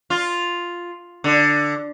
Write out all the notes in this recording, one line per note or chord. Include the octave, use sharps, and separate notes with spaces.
F4
D3